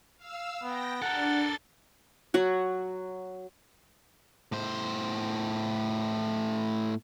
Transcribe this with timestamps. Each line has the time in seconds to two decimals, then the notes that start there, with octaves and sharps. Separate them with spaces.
0.17 F5 E6
0.63 B3 G5 A#6
1.02 D4 A4 A#4 F#5 A6
2.34 F#3 F#4
4.52 A2 C5